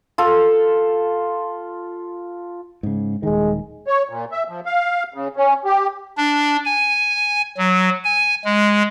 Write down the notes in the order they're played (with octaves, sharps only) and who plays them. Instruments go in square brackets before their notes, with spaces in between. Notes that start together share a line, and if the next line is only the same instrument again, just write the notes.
[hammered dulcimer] F4 A4
[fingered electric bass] G#2 C#3
[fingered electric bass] D#1 D#3 [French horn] G#3
[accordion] C#5
A#2
E5
F3
F5
C#3
C#4
G4
[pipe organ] D4
G#5
F#3
G#5
G#3